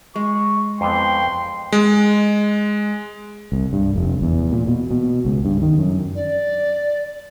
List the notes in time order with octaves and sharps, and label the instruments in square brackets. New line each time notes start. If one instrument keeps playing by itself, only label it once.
[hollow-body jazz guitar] G#3 [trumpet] C#6
[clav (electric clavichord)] F2 E3 B3 [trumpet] G5 [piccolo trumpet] C6
[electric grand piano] G#3
[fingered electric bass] C2
G2
F1
E2
A#2
B2
B2
C#2
G2
D#3
F#2
[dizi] D5